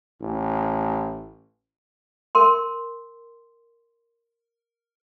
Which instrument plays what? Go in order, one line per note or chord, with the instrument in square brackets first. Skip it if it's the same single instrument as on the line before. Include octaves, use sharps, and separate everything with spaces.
[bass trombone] A1
[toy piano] A#4 C6